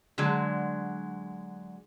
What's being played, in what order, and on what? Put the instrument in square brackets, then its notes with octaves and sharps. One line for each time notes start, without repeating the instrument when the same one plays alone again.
[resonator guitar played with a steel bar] D3 F#3 G#3